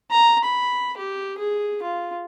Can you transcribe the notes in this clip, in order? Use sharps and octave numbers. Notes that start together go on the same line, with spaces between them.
A#5
B5
G4
G#4
F4